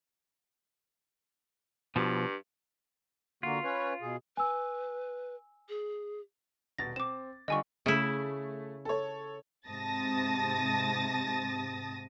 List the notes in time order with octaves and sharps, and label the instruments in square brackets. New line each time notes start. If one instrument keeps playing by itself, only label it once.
[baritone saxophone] G2 [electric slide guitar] B2 F3
[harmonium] D3 A#3 F#4 [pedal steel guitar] F4
[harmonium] C#4 B4 C#5
B2 G#4
[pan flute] B4 [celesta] G#5 E6
[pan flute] G#4
[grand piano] D#1 B2 A6 [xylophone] A#6
[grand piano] C4 [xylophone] D6 E7
[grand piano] D3 G3 F4 [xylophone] D#5 G#5 C#6
[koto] C#3 E4 [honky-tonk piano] A3
[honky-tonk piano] A4 C#5
[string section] G#2 C3 A5 D#6 A6 A#6